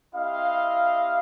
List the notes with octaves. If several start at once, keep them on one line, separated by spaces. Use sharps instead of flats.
C4 E4 G4 D#5 F5